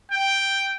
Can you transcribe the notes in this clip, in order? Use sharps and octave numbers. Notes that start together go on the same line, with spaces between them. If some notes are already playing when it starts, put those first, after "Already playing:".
G5